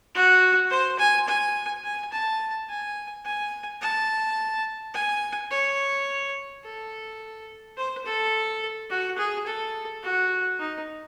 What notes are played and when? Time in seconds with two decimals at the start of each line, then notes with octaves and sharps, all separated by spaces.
0.14 F#4
0.70 C5
0.99 G#5
1.27 G#5
1.84 G#5
2.12 A5
2.69 G#5
3.25 G#5
3.81 A5
4.94 G#5
5.51 C#5
6.64 A4
7.77 C5
8.05 A4
8.90 F#4
9.18 G#4
9.46 A4
10.03 F#4
10.59 D#4